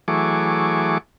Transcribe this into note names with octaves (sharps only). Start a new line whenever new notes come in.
E3 F#3 A3 G#4 C#6 D6